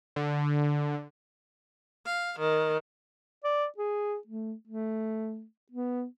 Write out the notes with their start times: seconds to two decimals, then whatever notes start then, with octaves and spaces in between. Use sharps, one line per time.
0.16 D3
2.05 F5
2.39 D#3
3.44 D5
3.78 G#4
4.27 A3
4.67 A3
5.71 B3